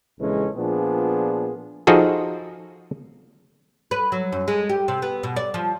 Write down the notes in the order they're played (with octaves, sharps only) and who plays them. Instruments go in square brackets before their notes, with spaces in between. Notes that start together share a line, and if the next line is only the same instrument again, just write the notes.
[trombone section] A#1 C#3 E3 G#3 C#4 A4
A#2 F3 B3 D4 G#4
[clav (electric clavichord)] F3 D#4 F#4 G#4 A4
[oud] B4
F#3
F#2
G#3
G4
C3
B3
B2
D5
F3